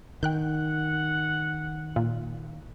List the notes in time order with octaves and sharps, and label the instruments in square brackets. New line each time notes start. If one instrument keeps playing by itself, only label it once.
[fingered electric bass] D#3 [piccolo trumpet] F#5 [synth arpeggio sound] G5 F#6 G6
[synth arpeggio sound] A#2